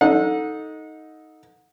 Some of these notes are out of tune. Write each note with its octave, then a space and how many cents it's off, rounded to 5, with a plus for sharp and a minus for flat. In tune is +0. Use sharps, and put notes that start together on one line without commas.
D#4 +10 A4 +5 F#5 -30